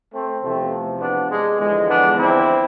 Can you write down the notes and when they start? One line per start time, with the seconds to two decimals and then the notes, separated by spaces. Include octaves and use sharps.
0.13 A3 C4
0.42 E2 C3 F3 A3 C4
1.00 B3 D4
1.30 G#3
1.59 E2 D3 F3 G#3
1.89 B3 D4
2.17 C4 E4